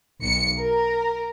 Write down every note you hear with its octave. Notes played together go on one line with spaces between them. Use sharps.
B1 C#7
A#4